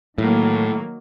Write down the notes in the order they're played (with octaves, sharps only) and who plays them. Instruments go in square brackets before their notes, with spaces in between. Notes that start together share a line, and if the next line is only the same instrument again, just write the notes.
[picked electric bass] A2 [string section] D#3 F#3 A#3